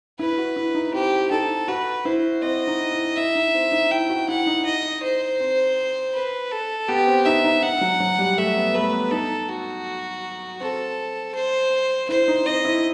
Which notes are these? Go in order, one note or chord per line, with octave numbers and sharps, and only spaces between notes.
E4 B4
F#4
E4
D#4
C4 G4
D#4 A4
F#4 B4
E4 C5
C4 D#5
D#4
E4
E4 E5
D#4
C4
D#4
E4 G5
F#4
E4 F#5
D#4
D#5
C5
C4
B4
A4
B3 G4
C4
D#4 E5
D#4
D#4 F#5
F#3
F#3
G3
A3 E5
B3
A3 B4
B3
D#4 A4
F#4
C4 A4
C5
E4 C5
D#4
C4 D#5
E4